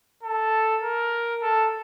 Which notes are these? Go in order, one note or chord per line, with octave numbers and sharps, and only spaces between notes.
A4
A#4
A4